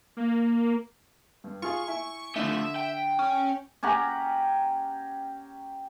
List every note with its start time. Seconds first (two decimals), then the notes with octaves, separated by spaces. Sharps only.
0.17 A#3
1.44 G2
1.62 F4 G#4 F5 C#6
1.87 E4 E5 G#5 C#6
2.36 D3 F3 A3 D4 E5
2.76 G5
3.19 C#4
3.83 C#4 G4 F#5 A#5